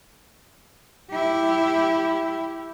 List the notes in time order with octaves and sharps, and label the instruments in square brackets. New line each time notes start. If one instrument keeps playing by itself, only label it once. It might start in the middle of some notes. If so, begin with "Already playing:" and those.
[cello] E4 G4